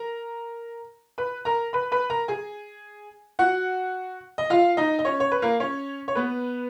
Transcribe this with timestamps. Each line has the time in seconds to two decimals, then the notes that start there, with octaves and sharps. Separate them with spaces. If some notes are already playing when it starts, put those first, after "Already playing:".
Already playing: A#4 A#5
1.18 B4 B5
1.45 A#4 A#5
1.73 B4 B5
1.92 B4 B5
2.10 A#4 A#5
2.28 G#4 G#5
3.39 F#4 F#5
4.38 D#5
4.50 F4 F5
4.77 D#4 D#5
4.99 D#5
5.05 C#4 C#5
5.20 C#5
5.32 B4
5.42 A#3 A#4
5.60 C#4 C#5
6.08 C#5
6.15 B3 B4